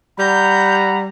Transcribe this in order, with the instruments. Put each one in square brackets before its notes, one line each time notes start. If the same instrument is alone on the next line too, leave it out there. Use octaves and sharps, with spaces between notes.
[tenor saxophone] G3 [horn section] F#5 A#5 B5 [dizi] G6